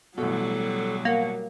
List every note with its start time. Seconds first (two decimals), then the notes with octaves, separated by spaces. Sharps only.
0.18 A1 B2 F#3 G3 A4
1.05 A#3 F#5